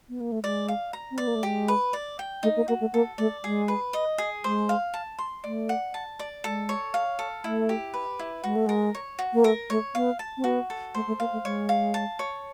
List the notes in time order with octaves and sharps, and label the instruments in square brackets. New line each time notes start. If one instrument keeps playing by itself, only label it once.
[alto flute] B3
A#3
A3
[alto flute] G#3 [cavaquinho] D5
[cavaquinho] F5
A#5
[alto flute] C4
[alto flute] B3 [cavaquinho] D5
[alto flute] A#3
A3
[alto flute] G#3 [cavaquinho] G4
[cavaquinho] B4
D5
G5
[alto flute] A3 [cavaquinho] D#4
[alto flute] A#3
[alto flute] A#3 [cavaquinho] F#4
[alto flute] A3
[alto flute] A#3 [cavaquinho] A4
[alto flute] A3 [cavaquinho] D5
[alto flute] G#3 [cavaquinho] G#4
[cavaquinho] B4
D#5
G#4
[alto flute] G#3 [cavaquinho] C5
[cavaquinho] F5
A5
C6
[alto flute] A3 [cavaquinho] D5
[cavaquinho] F#5
A5
D5
[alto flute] G#3 [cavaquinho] A4
[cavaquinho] C#5
F5
A4
[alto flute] A3 [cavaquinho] E4
[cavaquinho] G4
B4
E4
[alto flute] G#3 [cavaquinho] F#4
[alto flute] A3
[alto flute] G#3 [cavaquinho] A#4
[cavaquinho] C#5
F#4
[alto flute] A#3
[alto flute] A3 [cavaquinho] A#4
[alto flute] A3 [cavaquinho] C#5
[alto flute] B3 [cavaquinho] F5
[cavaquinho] A5
[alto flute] C4
[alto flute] B3 [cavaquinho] F#4
[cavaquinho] A4
[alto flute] A3 [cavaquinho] C5
[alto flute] A3
[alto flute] A#3 [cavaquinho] F5
[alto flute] A3
[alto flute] G#3 [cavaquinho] C#5
[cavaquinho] F5
A5
C#5